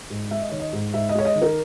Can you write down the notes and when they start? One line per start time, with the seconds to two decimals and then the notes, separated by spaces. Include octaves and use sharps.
0.10 G#2
0.31 G#3 E5
0.40 D#5
0.50 D#3 C#5
0.60 D#5
0.73 G#2
0.94 G#2 E5
1.09 D#5
1.15 G#3 C#5
1.25 D#5
1.36 D#3
1.42 A#4